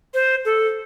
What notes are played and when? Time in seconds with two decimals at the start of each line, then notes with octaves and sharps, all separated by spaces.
0.14 C5
0.45 A4